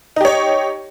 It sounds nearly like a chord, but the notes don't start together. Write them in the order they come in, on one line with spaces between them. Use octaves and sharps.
D#4 G4 C#5